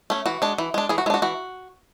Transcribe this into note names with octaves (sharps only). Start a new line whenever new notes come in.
A3 C#4
E3 F#4
G#3 D4
E3
G#3 D4
E3 G#4
F#4
G#3 D4 E4 F#4
E3 F#4